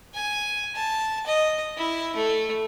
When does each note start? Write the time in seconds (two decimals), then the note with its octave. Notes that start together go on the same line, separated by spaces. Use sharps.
0.14 G#5
0.75 A5
1.26 D#5
1.77 E4
2.15 A3